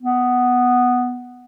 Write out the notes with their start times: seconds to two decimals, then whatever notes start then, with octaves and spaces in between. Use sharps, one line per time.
0.02 B3